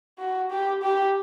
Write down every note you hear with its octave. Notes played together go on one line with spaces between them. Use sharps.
F#4
G4
G4